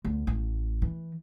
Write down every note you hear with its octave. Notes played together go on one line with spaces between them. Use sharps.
D2
A1
E3